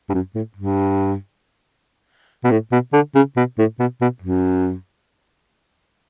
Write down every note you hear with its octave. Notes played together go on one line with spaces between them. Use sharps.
G2
F#2
A2
G2
B2
A2
B2
D3
C#3
B2
A2
B2
B2
F#2